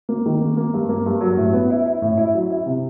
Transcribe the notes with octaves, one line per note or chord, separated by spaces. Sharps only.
A#3
D#3
A#3
A#3
G2
A#3
G2
F#3
A2
B3
E4
E4
A2
E4
F#3
E4
C3